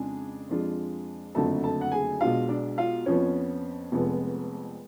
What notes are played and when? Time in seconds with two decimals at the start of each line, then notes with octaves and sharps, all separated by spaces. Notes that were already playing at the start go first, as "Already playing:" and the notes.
Already playing: F2 C#3 G#3 D4 F4 G#4 G#5
0.49 F2 F3 G#3 D4 F4
1.35 F#1 F2 D3 F#3 A3 A4 A5
1.64 A4 A5
1.81 F#5
1.92 G#4 G#5
2.21 B1 B2 G#3 D4 F4 F5
2.49 D4 D5
2.78 F4 F5
3.06 F2 F3 B3 C#4 C#5
3.92 F1 F2 F3 G#3 B3